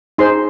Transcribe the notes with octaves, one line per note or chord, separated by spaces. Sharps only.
D#4 G#4 C5 C6